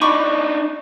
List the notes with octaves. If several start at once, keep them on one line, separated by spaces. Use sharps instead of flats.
D4 D#4 B5 C#6 D6